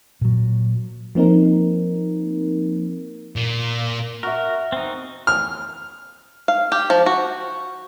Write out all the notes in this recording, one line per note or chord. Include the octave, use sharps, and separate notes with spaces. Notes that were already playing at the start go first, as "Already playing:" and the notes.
A#2 F#3
F3 A#3 C4 D#4 A#4
A#2
F#4 A#4 E5
C4 D#4
F6
F5
G4
F3
F#4